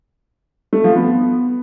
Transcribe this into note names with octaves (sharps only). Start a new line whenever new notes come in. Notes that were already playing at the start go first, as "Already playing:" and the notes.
A3
F3
B3